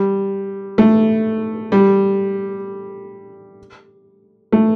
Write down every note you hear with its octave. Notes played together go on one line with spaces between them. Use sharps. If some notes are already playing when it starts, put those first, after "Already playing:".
Already playing: G3
A3
G3
A3